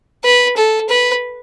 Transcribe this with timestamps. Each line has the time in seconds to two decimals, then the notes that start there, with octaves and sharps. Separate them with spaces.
0.24 B4
0.57 A4
0.89 B4